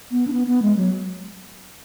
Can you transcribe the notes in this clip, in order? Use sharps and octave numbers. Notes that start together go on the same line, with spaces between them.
B3
D4
B3
B3
G#3
F#3